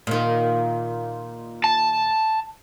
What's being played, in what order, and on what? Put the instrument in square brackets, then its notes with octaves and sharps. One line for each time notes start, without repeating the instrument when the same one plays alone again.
[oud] A#2 D#3
[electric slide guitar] A5